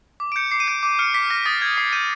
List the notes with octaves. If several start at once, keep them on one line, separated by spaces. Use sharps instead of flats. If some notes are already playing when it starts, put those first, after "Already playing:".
D6
D7
G6 C#7
D6 C7
D#7
G6 D7
D6
F6 C#7
D6 B6
F6 A#6
D#6 A6
G6 G#6
D#6 C7
G6 D#7